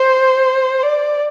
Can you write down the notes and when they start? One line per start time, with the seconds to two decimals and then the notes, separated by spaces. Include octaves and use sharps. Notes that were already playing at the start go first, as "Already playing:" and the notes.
Already playing: C5
0.83 D5